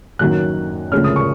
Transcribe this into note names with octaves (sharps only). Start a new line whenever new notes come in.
F#1 F#2 D#3 F#3 F#6
D2 C#3 F3 G#3 C#4 F6
D#6
C#6